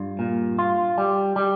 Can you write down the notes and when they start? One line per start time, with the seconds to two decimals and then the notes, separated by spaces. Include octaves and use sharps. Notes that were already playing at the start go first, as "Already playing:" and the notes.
Already playing: G2 F4
0.19 A#2
0.59 F4
0.98 G3
1.36 G3